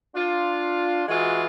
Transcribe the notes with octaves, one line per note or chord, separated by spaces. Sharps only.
D4 F4
E3 G#3 F4 F#4 G#4